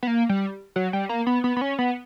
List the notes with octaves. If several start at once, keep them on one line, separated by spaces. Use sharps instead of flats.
B3
A#3
G3
F#3
G3
A#3
B3
B3
B3
C#4
B3